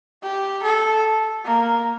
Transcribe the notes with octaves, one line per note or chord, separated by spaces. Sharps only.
G4
A4
A#3